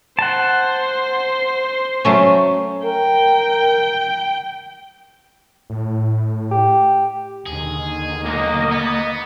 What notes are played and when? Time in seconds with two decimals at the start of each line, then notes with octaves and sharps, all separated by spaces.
0.19 C5 F#5 A5
2.05 F#3 A3 C#4
2.85 A#4 G5
5.70 A2
6.51 G4
7.46 D#2 D3 D#3 G#4
8.26 B1 A#3 D#5
8.72 B3